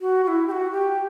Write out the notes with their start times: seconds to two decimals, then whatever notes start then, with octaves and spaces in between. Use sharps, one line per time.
0.01 F#4
0.24 F#4
0.28 E4
0.48 G4
0.51 F#4
0.71 G4